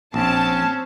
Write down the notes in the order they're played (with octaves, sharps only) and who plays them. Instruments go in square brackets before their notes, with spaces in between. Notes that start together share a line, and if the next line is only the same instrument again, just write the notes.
[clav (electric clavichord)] A#1 [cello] C4 [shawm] C#4 [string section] A5